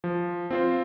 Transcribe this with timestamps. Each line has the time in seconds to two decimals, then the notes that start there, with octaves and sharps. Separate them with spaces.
0.04 F3
0.51 C4 F4 C5